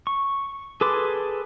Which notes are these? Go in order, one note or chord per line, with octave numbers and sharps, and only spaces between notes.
C#6
G#4 A4 B4 C6 D6